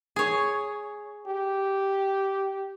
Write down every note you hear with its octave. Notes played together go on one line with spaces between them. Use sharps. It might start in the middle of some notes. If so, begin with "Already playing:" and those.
G#4 C#5
G4